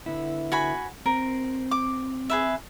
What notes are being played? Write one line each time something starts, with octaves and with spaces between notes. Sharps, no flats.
D3 B3 E4
F#4 G#5 B5
C4 A#4
D6
G#4 B4 E5